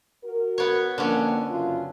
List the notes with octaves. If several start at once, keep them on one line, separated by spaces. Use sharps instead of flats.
F#4 A#4
B3 C#5
F2 D3 A#3 C#4
F#2 C#3 F4